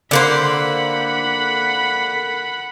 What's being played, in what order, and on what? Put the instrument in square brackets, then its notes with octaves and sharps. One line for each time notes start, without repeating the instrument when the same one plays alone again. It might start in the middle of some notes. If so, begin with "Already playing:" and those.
[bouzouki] D3 A#3 C5 [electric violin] F#5 B5